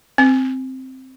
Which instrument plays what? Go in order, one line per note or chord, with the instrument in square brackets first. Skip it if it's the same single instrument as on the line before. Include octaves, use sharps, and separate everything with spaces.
[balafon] C4